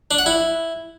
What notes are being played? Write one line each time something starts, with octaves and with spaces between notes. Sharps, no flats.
D4
F#5
E4